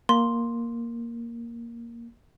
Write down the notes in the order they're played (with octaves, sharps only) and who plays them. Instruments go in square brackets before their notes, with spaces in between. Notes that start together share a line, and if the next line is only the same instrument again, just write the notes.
[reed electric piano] A#3 [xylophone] C6